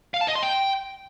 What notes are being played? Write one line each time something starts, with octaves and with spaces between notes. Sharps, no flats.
F5
A5
D#5
C6
G5